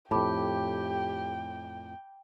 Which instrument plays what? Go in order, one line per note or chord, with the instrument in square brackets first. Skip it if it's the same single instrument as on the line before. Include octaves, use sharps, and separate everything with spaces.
[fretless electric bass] F2 A2 [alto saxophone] G4 [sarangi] G5 [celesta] A5 B5 D6